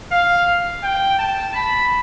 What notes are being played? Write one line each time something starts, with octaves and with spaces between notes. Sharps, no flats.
F5
G5
A5
B5